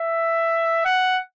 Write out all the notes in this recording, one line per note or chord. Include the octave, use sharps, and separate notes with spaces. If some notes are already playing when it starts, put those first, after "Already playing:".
Already playing: E5
F#5